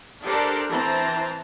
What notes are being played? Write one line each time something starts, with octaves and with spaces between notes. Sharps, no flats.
D4 G4 A4 A#4 C5 D5
E3 C4 A5 A#5